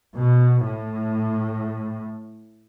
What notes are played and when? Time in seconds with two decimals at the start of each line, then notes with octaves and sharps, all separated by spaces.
0.16 B2
0.67 A2